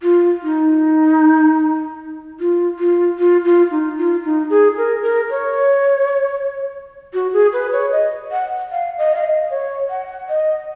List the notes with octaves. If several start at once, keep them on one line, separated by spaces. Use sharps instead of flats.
F4
D#4
F4
F4
F4
F4
D#4
F4
D#4
G#4
A#4
A#4
C#5
F#4
G#4
B4
C#5
D#5
F#5
F5
D#5
F5
D#5
C#5
F#5
D#5